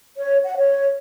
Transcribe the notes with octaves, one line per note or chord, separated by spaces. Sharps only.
C#5
F#5
C#5